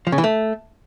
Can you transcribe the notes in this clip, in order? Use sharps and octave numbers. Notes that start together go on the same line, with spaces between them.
F3
C#3
E3
A3